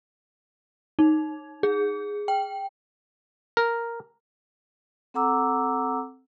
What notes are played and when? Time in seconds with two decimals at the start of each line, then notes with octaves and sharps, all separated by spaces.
0.99 D#4
1.63 G#4
2.28 G5
3.57 A#4
5.14 C4 A4 F#5 A#5 D6 E6